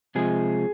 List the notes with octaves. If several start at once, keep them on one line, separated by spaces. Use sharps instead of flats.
C3 F3 G#3 G#4